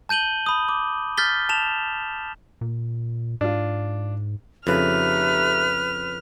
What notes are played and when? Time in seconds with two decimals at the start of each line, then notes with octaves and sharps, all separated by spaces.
0.09 A5 G6 D#7 F#7 G7
0.46 B5 D#6
0.69 D6
1.17 F6 G6 A6 B6 G7
1.49 A5 E7 F7
2.61 A#2
3.41 G#2 D4 F4
4.67 F2 C#3 A3 D#4 G4 B4 F6